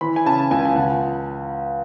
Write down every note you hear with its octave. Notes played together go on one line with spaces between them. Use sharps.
E3 B5
G#5
C#3 A5
C#2 G#5
G#5
C#2 F#5